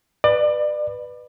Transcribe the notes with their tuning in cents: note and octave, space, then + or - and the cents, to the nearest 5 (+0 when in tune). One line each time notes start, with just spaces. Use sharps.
B4 +0 D5 +30